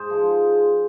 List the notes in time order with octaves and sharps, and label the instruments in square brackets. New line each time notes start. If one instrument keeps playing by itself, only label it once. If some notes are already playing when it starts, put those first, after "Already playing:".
Already playing: [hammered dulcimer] G#2 G#4 C5
F3 G#3